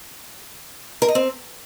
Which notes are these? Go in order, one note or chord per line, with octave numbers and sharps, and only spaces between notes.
A#4
D#5
C4